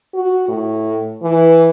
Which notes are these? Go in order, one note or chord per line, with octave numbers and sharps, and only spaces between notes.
F#4
A2
E3